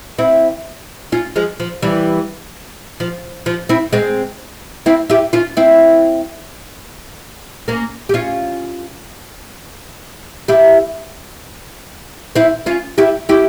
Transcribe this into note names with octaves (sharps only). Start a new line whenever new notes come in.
C4 E4
C#4 F4
F3 G#3
F3
E3 G3
F3
F3
C4 E4
G#3 C4
C4 E4
E4 G4
C#4 F4
C4 E4
A#3 C#4
G4
C#4 F4
E4 G4
C4 E4
C#4 F4
E4 G4
E4 G4